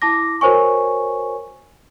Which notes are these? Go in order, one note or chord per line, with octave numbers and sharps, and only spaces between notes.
E4 A5 D6 A#6
F#4 A#4 C5 C#5 G#5 C#6